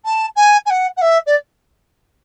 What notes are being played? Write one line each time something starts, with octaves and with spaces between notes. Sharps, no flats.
A5
G#5
G#5
F#5
F#5
E5
D5